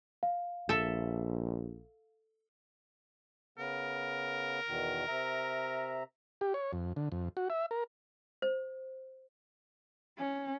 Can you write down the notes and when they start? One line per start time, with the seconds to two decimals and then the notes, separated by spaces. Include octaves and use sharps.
0.23 F5
0.69 A#1 A4 E5
3.58 C#3 B3 A#4
4.68 E2 B2 D#3
5.08 C3 E5 A#5
6.41 G4
6.54 C#5
6.73 F2
6.96 D3
7.12 F2
7.37 F#4
7.50 E5
7.71 A#4
8.42 C5
10.17 C#4